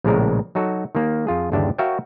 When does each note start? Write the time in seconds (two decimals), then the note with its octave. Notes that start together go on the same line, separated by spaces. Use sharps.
0.04 A#1 A2 C#3 G#3 A#4
0.55 F#3 D#4 F#4 A4
0.95 D#3 A#3
1.27 F2 F4 G#4
1.52 G1 D#2 C#3 D4 G4 E5
1.78 F#4 A#4 C#5 E5 F5 G5